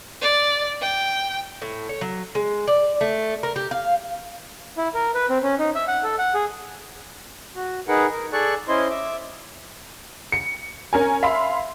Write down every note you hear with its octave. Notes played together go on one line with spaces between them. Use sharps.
D5
G5
A2
C#5
F#3
G#3
D5
A3
A#4
G4
F5
E4
A#4
B4
C4
C#4
D#4
E5
F#5
A4
F#5
G#4
F#4
D#4 G#4 A#4 B4 F#5
A#4
G#4 A4 D5 C#6 F#6
C#4 E4 C5 D#5 C6
E5 D6
C#7
C#4 A#4 G#5
E5 F5 B5 C6